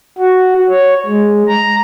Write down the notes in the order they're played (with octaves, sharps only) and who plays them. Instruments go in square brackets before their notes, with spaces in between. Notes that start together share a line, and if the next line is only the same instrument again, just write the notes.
[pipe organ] F#4
C#5
G#3
A#5